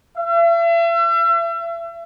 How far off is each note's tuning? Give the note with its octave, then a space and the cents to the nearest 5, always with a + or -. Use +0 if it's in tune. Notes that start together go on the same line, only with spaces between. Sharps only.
E5 +40